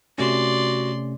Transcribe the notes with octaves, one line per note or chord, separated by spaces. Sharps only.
C3 A3 C#4 F#4 D5 C6